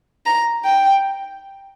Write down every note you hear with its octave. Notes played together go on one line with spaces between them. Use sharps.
A#5
G5